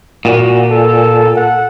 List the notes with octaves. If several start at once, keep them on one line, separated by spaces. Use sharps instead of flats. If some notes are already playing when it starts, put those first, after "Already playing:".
A#2 F#4
A4
F#5